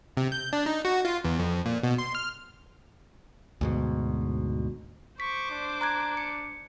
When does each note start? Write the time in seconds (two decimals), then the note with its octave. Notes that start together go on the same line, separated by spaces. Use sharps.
0.17 C3
0.32 G6
0.53 D4
0.66 D#4
0.85 F#4
1.05 F4
1.24 E2
1.39 F2
1.66 A#2
1.83 B2
1.98 C6
2.15 F6
3.61 D2 G#2 B2
5.20 C5 C#6 D6 B6
5.51 D4
5.81 A#5 F#6 G#6
6.17 C#7